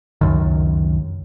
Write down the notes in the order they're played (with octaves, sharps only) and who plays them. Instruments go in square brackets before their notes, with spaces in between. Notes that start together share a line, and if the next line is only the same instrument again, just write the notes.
[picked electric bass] C#2 F#2 D#3